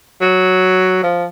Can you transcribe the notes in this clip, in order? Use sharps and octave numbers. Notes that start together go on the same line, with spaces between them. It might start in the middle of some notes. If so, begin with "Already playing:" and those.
F#3
F3